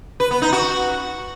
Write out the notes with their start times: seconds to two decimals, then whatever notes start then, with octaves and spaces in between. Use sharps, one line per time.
0.20 B4
0.31 B3
0.42 D#4
0.53 F#4